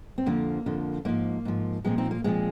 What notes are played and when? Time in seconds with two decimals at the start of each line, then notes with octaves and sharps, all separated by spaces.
0.18 C4
0.26 F2 D3 F3 A#3
0.66 F2 D3 F3
1.05 G#2 F3 A#3
1.45 G#2 F3
1.84 A#2 F3 G#3 C4
1.98 C4 D#4
2.11 A#3
2.24 A#2 F3 G#3 C4